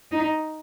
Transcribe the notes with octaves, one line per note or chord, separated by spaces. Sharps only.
D#4